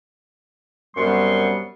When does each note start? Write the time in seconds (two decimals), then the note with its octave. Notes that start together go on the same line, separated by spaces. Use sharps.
0.96 F#2 C3 G3 B3 C6 C#6